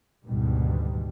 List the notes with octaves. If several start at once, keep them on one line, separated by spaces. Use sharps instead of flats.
D2 G#2 B2 D#3 G3